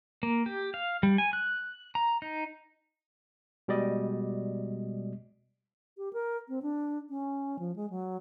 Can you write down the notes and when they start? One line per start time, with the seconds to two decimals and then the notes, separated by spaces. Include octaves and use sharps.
0.23 A#3
0.46 G4
0.74 F5
1.03 G3
1.18 G#5
1.33 F#6
1.95 A#5
2.22 D#4
3.68 B2 G3 G#3 D5 D#5
5.98 G4
6.13 A#4
6.48 C4
6.62 D4
7.10 C#4
7.59 F3
7.76 G#3
7.90 F#3